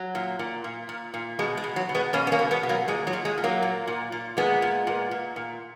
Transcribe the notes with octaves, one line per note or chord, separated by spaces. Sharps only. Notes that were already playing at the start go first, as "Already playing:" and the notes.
Already playing: F#3
A#2
A#2
A#2
A#2
A#2
B2 G#3
G#3
B2
F#3
B2
G#3 B3
B2 A#3 C#4
B3
A#3 C#4
B2
G#3 B3
B2
F#3 A#3
A#2 G#3
F#3
A#2
G#3
A#2
F#3 A#3
A#2
A#2
A#2
A#2 G#3 B3
A#2
A#2
A#2
A#2